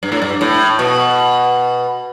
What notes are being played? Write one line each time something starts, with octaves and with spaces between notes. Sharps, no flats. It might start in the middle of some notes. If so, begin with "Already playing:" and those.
G2
A2
G2
A2
B2